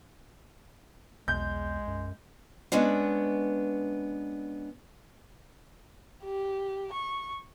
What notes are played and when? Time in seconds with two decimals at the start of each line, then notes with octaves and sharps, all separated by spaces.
1.28 B1 E2 G#3 G6
1.87 F#2
2.72 G#3 B3 C#4 D4
6.25 G4
6.93 C#6